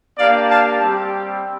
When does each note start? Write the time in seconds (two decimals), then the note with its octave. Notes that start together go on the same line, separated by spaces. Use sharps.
0.18 A#3 D4 G4 D5 F5
0.49 F5 A5
0.80 G3 C4 G4